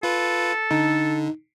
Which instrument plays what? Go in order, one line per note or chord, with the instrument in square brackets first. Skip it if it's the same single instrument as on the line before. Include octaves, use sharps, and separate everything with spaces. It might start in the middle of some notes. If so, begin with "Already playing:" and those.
[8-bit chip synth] F4 B4 [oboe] A4
[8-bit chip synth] D3 [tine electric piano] D#4